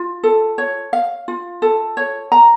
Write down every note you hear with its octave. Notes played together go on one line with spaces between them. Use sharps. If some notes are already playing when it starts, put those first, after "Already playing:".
Already playing: F4
A4
C#5
F5
F4
A4
C#5
A#5